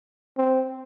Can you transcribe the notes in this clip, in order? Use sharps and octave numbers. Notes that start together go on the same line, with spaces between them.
C4